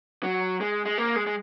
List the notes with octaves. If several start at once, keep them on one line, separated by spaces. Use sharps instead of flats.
F#3
G#3
G#3
A#3
G#3
G#3